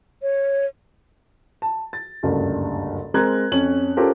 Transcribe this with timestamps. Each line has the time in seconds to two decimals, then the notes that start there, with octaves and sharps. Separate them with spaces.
0.22 C#5
1.62 A5
1.93 A6
2.23 F#1 D2 G2
3.14 G#3 C4 A#4 A#5 F#6 G#6
3.51 F2 C#4 F#7
3.97 C#4 F4 G4 A4 A#4 C5